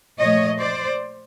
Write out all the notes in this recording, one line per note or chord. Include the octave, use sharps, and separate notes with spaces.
A#2 F3 A3 C#5 D#5
C5 D5